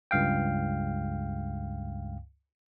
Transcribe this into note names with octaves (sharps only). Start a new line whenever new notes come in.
C#2 G2 F5 G5